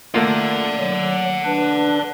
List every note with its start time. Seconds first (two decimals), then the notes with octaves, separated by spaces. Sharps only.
0.14 A3 A#3 F4 D5 F#5
0.80 F#3
1.45 D4 B4